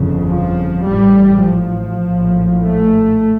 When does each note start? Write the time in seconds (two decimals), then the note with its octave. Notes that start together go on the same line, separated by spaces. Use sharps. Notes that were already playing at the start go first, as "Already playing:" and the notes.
Already playing: G1 F2 C#3
0.24 F3
0.84 A1 A2 G3
1.43 F3
2.02 A#1 A2
2.62 A3